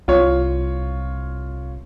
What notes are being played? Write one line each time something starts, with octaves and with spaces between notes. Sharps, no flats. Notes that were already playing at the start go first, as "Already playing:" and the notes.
C2 F4 C#5